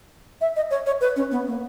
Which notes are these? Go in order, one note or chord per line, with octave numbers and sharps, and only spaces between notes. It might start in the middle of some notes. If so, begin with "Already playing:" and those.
E5
D#5
C#5
C#5
B4
C#4
B3
A#3